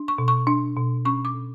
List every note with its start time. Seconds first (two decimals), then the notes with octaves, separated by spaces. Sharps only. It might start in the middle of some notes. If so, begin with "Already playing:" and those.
Already playing: D4
0.08 C#6
0.18 B2
0.28 C#6
0.47 D4
0.76 B2
1.05 C#4 C#6
1.25 D6
1.34 B2